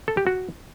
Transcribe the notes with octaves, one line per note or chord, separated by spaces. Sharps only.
A4
G4
F#4